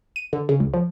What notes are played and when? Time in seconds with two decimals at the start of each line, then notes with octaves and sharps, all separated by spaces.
0.16 D#7
0.33 D3
0.49 C#3
0.60 C#2
0.74 F3